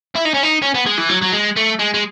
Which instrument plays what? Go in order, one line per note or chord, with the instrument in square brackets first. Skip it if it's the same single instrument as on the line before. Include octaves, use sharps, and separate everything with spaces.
[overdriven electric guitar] E4
D#4
C#4
D#4
C#4
B3
G#3
E3
F#3
F#3
G#3
A3
G#3
G#3